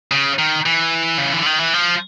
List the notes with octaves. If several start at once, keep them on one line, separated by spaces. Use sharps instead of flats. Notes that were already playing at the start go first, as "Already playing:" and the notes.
C#3
D#3
E3
C#3
D3
D#3
E3
F3